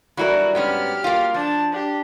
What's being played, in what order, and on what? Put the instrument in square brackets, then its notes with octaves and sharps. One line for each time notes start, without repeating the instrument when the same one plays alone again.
[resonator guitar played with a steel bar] E3 E4 A#4 [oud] F#3 G3 D4 [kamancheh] F#4
[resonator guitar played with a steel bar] G#2 B3 C#4 [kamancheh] G4 F6
[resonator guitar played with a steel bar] A#3 F4
[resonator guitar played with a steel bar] F3 [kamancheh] D4 A5
[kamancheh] D4 G4